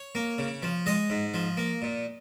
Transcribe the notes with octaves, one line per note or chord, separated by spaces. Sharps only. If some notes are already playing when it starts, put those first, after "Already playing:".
Already playing: C#5
A#3
C#3
F3
G#3 D#5
G#2
F3
A#3
A#2